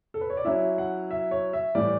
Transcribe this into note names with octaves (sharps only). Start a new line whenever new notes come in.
A4
B4
C#5
D5
F#3 C#4 E4 E5
F#5
E5
C#5
E5
A2 E3 G3 D5